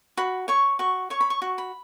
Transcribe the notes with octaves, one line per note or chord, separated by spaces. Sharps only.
F#4 B5
C#5 C#6
F#4 C#6
C#5 C#6
B5
C#6
F#4
B5